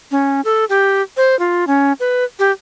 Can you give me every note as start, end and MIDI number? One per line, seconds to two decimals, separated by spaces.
0.11 0.41 61
0.45 0.65 69
0.69 1.02 67
1.17 1.38 72
1.39 1.65 65
1.67 1.93 61
2.00 2.24 71
2.39 2.51 67